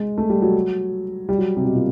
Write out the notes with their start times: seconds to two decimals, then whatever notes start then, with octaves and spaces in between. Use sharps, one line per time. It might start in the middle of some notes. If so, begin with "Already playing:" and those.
Already playing: G#3
0.18 A3
0.30 G3
0.42 F#3
1.29 G3
1.38 F#3
1.57 C3
1.65 B2
1.75 A#2